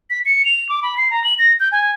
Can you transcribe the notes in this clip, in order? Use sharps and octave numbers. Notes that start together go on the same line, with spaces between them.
B6
C#7
F7
D6
B5
C7
A#5
F#7
A#6
G6
G#5